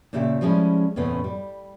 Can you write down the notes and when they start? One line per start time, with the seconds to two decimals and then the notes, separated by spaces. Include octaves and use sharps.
0.13 A#2 C#3 A3 G4 E5
0.41 F3 G3 G#3 C#4 E4
0.96 E2 A2 C3 B3 C#4
1.24 G3